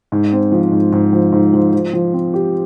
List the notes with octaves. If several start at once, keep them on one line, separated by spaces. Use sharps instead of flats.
G#2
C4
F3
G#2
G#2
F3
G#2
F3
F3
F3
C4
G4